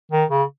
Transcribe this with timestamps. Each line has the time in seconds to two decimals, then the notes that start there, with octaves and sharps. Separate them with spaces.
0.12 D#3
0.30 C#3